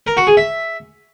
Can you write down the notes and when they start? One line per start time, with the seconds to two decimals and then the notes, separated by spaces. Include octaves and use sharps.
0.07 A#4
0.17 F#4
0.27 G#4
0.37 E5